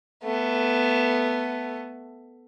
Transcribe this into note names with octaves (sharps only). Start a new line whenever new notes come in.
A3 B3